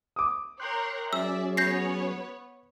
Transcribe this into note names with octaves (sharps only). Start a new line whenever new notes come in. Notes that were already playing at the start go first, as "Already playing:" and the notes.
D6 D#6
A#4 C#5 G5 C6 F#6
F#3 C#4 G#4 D5 E5 E6
B3 B4 C#5 G6 A#6 C7